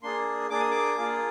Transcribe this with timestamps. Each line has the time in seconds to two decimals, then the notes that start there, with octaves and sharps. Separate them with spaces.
0.03 A#3 D4 G#4 C6
0.50 A#3 D4 G#4 D6
0.60 D#6
0.71 D6
0.97 A#3 F4 G#4